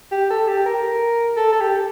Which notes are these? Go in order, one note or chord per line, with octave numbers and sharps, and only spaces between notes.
G4
A4
G4
A#4
A4
A4
G4